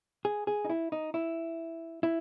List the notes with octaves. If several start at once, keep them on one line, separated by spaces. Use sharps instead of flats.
G#4
G#4
D#4
E4
D#4
E4
E4